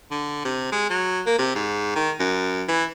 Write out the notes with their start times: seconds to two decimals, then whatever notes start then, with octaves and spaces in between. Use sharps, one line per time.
0.11 D3
0.45 C3
0.72 G#3
0.90 F#3
1.26 A#3
1.38 C3
1.55 G#2
1.95 D#3
2.20 F#2
2.68 E3